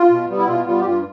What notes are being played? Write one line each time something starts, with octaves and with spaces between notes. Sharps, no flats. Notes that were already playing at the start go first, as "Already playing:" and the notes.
Already playing: F4
B2
G3 B3
E4
B2 F4
G3 B3 F4
G4
G2 F4